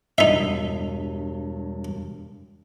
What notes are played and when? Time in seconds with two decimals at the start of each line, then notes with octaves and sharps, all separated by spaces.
0.18 E1 G2 D#4 E5